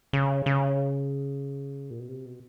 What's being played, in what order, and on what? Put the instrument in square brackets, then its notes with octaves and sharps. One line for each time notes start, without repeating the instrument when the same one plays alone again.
[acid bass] C#3
C#3
A#2
B2
C3
B2